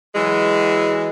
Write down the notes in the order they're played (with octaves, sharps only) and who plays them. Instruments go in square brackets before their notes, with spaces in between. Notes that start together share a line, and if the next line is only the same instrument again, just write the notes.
[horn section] E3 F#3 G#3